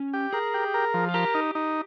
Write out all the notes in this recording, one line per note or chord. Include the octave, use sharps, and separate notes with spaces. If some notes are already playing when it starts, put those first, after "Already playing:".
Already playing: C#4
G4
G#4 A#4
G4
A#4
F3
F4
G4 A#4
D#4
D#4